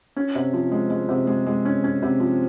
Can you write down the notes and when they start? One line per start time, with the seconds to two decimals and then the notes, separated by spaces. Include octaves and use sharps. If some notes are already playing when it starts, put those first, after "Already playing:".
0.16 C#4
0.35 C3
0.53 F3
0.71 G#3
0.90 G#3
1.09 C3
1.27 G#3
1.46 G#3
1.65 C#4
1.84 C#4
2.03 C3
2.20 F3